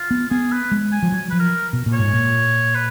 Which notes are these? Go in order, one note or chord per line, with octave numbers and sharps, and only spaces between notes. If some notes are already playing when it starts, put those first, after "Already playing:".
Already playing: F4
B3
B3 G#4
B4
G#3
G#5
F3
F#3
F3 B4
A#4
B2
A#2
C#5
G#2
A#2
B4